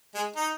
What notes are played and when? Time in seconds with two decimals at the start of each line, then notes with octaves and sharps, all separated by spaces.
0.15 G#3
0.36 D#4